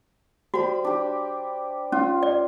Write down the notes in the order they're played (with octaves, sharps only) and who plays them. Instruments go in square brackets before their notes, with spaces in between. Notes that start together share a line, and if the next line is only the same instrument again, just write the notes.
[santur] G3 C5 B5 [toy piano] F#4
[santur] D4 G4
[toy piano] C#4 [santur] F4
[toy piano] D5